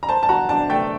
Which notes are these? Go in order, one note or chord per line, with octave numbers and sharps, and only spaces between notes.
A#5
C5 A5
A5
F#4 A#5
D4 A5
A3 G5